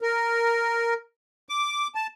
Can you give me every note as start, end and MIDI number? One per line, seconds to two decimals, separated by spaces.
0.01 0.94 70
1.49 1.87 86
1.95 2.07 81